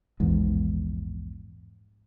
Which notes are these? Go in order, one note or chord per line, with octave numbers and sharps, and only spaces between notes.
A#1 E2 G#2